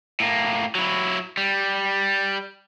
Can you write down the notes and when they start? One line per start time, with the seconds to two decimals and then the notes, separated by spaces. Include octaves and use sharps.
0.20 A2 A#3
0.75 F#3 E4
1.37 G3